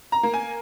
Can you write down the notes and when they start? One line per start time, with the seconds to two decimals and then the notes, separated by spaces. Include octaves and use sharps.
0.12 A#5
0.23 A#3
0.34 G#5